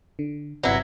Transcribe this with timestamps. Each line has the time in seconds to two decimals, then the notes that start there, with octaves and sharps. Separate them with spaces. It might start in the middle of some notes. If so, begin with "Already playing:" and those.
0.19 D3
0.63 G1 C3 F#3 E4 B4